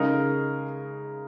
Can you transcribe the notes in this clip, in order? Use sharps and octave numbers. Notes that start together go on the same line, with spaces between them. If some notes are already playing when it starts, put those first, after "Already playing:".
Already playing: C#3 G#3 D#4 A#4